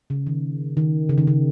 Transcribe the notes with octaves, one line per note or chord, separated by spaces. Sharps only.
C#3
D#3
D#3
C#3
D#3
C#3